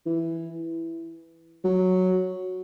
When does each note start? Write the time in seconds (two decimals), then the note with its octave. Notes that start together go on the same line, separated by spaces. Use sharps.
0.06 E3
1.64 F#3